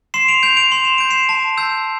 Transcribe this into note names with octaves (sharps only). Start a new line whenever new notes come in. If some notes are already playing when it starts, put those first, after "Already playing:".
C6 C7 E7
D7 F7
G6 D7 F7
D7 F7
C6 F7
E7
G6 D7
C7 E7
A5
E6 G6